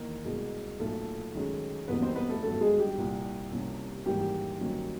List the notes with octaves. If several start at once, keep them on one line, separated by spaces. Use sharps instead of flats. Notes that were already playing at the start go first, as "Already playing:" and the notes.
Already playing: E2 D#3 A#3 A#4
C2 B2 G#3
B1 A#2 F3 A3 A4
F#2 D#3 G#3 C#4
F#1 E2 B2 G3 A#3 B3 B4
C4 C5
B3 B4
A3 A4
G#1 G2 D3 F#3 A3 B3 A4
G#3 G#4
G3 G4
C2 A#2 F3
C2 C3 F3 A#3 C#4
G#1 G#2 E3 G3 A#3 G4
G2 D#3 F#3 A#3 C#4